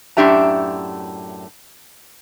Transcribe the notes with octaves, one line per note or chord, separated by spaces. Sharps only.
F#2 A2 D4 G4 E5 A#5